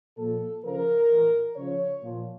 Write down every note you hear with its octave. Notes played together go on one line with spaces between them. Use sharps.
A#2 F3 A4
C#3 F3 A#4
E3
A2
C#3 F3 C#5
A#2 F3